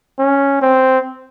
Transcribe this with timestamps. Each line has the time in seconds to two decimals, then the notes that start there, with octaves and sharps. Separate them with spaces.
0.19 C#4
0.61 C4